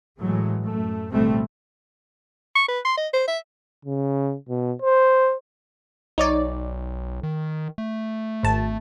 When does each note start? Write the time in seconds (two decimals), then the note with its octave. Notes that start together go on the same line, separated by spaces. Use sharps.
0.22 A2 E3 F#3 G#3 A3
0.66 F#2 A3
1.12 A1 D2 B2 G3 A3 C4
2.55 C#6
2.68 B4
2.85 C6
2.97 D#5
3.13 C5
3.27 E5
3.85 C#3
4.49 B2
4.82 C5
6.18 B1 D#4 C#5 D5
7.23 D#3
7.78 A3
8.43 G#1 A5